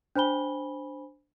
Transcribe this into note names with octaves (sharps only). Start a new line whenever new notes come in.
D4 C5 G#5 B5 G7